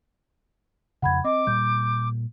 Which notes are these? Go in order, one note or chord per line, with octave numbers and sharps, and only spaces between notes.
F2 C#3 F#5 B5 G#6
C4 D#5 D6
A#2 G3 G6